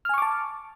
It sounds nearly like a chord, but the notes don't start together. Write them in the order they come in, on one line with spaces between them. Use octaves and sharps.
F6 G#5 C#6 D6 A5